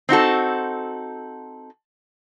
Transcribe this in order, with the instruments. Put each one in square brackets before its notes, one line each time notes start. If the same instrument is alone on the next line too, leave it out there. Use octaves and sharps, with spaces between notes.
[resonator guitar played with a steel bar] C4 D#4 F#4 A4